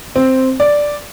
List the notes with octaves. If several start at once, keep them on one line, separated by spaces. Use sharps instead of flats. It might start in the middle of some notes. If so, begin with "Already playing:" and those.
C4
D5